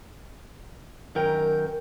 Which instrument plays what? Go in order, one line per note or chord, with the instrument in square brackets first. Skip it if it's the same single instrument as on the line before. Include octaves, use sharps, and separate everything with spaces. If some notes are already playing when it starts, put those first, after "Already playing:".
[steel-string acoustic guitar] F#2 D#3 A#4 G5